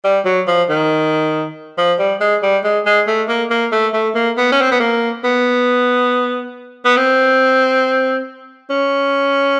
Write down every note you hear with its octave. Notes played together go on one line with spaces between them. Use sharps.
G3
F#3
F3
D#3
F3
G3
G#3
G3
G#3
G#3
A3
A#3
A#3
A3
A3
A#3
B3
C#4
C4
B3
A#3
B3
B3
C4
C#4